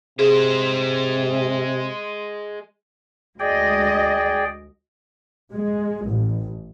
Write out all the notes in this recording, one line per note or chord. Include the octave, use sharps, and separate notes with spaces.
C3 G#3 G#4 C5
D2 G#3 G#4 D5 D#5 G5
G#3
A1